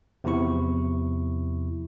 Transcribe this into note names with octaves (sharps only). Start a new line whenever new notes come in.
E2 C3 F3 E4 C#6